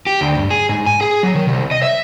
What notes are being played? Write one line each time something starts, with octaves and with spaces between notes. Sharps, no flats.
G4
D2
G2
G#4
G#2
G#5
G#4
F#3
D#3
C2
D#5
E5